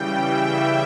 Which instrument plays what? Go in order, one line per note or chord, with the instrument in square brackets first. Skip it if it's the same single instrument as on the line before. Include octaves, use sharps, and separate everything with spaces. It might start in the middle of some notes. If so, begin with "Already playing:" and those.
Already playing: [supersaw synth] C#3 E3 G3 G5
E5